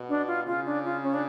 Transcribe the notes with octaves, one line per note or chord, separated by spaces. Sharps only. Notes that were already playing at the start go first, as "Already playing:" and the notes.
Already playing: B2
D4
F4
C#3 F4
D4
F4
C#4
D4